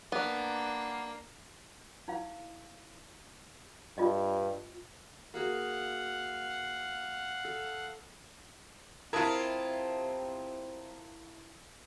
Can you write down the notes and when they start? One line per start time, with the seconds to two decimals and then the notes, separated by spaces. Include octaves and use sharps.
0.12 A#3 B3 D4
2.08 D#4 E4 F5
3.98 G2 F4 D#5
5.34 A#3 F#4 G#4 F5 F#5
7.45 A4
9.13 C3 C4 E4 F4 A#4 A5 D#6 G#6